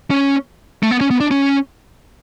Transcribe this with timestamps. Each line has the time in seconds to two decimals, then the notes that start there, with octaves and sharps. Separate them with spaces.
0.11 C#4
0.83 A3
0.91 B3
1.01 C#4
1.11 B3
1.20 D4
1.31 C#4